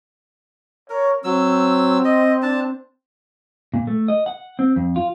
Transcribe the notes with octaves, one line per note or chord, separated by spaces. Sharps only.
A#4 C#5
F#3 C4 E6
D#5
D4 A5
A#2
A3
D#5
F#5
C4
F2
F4